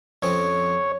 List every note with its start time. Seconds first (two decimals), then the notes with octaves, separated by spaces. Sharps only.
0.22 F2 C4 C#4 C#5